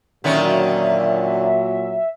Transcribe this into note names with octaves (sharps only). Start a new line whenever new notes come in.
A#2 D3 D#3 F#3 C#4 E5